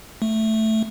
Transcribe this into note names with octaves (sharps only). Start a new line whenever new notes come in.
A3